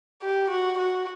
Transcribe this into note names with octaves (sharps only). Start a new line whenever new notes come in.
G4
F#4
F#4